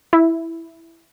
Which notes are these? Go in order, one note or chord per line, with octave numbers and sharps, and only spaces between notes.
E4